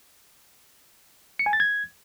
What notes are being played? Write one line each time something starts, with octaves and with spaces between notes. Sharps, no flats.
C#7
G#5
A6
G#6